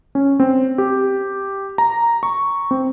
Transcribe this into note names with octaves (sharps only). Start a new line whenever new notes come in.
C#4
C4
G4
A#5
C#6
C4